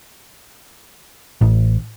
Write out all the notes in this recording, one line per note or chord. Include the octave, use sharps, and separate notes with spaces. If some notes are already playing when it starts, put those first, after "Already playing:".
A1